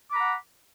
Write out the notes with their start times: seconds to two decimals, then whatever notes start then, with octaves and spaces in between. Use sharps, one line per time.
0.10 D6
0.13 B5
0.16 A#5
0.19 F#5